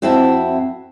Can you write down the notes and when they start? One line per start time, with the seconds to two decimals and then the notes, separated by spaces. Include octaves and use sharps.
0.02 F2 C4 E4 F#4 E5 A5